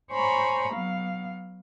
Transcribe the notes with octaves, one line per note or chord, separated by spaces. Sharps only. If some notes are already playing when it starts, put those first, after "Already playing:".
C5 C#5 G#5 A#5 B5 C#6
F#3 B3 F5